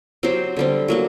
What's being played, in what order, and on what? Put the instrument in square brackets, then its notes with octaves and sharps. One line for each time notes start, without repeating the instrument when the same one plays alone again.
[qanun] F#3 C4 G4 C5
D3 G3 C4
F#3 A#3 F#4